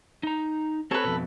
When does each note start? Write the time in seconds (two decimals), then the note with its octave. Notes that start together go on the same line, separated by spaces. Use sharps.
0.23 D#4 A#5
0.91 C4 A4 B4 C#5
1.04 F2 B2